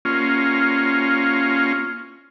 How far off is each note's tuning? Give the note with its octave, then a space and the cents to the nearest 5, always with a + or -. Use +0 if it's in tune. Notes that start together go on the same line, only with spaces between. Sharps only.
A#3 +0 C#4 +0 F4 +0